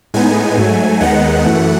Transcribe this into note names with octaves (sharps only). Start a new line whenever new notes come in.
A2 G#3 B3 D#4 G#5
G#2 F#3 A3
D#2 D#3 G#3 B3 D#4 F#5
F#2 E3 A3